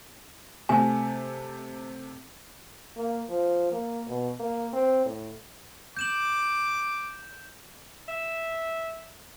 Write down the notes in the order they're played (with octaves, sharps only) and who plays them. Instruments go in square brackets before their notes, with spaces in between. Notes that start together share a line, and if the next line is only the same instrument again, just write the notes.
[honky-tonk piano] C3 A3 [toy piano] G#5
[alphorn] A#3
F3
A#3
B2
A#3
C4
A2
[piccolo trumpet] D6 [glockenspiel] G6 E7 F#7
[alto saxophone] E5